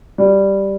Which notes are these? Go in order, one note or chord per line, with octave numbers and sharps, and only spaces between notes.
G3